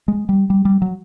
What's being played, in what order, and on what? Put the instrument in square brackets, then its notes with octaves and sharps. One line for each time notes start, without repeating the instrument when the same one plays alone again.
[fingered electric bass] G#3
G3
G3
G3
F#3